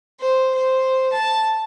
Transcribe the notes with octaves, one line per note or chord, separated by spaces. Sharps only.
C5
C5
A5